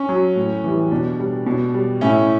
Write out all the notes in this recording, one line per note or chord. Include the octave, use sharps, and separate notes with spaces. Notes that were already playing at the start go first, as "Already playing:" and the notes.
Already playing: C#4
F#3
A2
E3 G3
B2 D4
G3
B2
G3
A2 C#4 E4